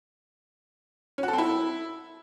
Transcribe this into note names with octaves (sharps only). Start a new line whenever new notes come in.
C#4
F#4
A4
C4
E4